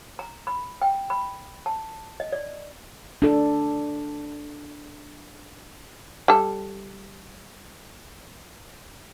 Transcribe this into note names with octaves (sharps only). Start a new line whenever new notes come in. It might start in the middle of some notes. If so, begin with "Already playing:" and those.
A#5
B5
G5
B5
A5
D#5
D5
D4 A4
G3 A4